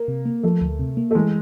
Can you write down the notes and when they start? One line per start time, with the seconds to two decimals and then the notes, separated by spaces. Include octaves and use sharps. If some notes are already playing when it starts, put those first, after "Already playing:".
Already playing: A#3
0.08 C3
0.25 A#3
0.43 F3 A3
0.61 D2
0.79 C3
0.97 A#3
1.11 A3
1.15 E3 G#3